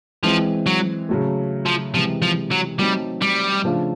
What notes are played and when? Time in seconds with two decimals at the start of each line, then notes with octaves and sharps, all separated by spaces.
0.23 E3 F3 G#3 C4
0.66 F#3
1.09 C#3 F#3 A3
1.66 F3
1.94 C3 E3 F3 G#3
2.22 F3
2.51 F#3
2.79 F#3 G3 A3 C4 D#4
3.22 G3
3.64 C#3 F3 A3 D4 F4